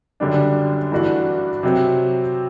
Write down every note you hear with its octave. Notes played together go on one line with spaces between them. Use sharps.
F#2 D3 G3 D4
G2 E3 A3 D4 F#4
C3 F#3 C4